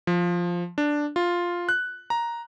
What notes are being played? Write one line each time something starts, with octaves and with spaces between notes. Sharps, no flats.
F3
D4
F4
F#6
A#5